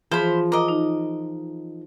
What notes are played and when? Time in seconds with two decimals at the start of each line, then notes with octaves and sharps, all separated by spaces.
0.11 E3 F3 F4 G#4 C5 B5
0.52 A#4 D#5 D6
0.68 D#4